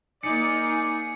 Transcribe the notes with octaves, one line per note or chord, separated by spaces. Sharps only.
A#3 D#4 G#4 D5 C#7